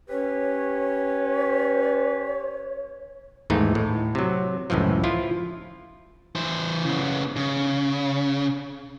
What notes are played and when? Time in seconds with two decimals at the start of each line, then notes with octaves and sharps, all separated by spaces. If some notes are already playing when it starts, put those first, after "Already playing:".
0.09 C#4 G4 B4 C#5
3.50 D#2 G#2 E3 A3 D#4
3.75 A2
4.15 C3 F#3
4.70 C#2 F#2 A2 E3 F3
5.04 F3 E4 F4
6.35 E3 C5
6.85 C#3 B3
7.36 C#3